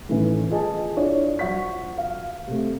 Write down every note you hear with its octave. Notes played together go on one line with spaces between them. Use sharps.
A2 D#3 E3 C#4 B4
F4 G#4 D#5 G#5 A5
D4 E4 F4 C#5 D5
F3 F#4 F#5 C#6 B6
F5
C3 A3